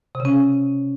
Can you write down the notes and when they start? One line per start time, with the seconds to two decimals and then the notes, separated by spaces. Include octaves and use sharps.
0.15 C3
0.20 C#3
0.25 C#4